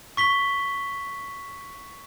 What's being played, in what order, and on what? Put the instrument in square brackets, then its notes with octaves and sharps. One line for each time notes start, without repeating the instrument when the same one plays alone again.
[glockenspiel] C#6 B6 G7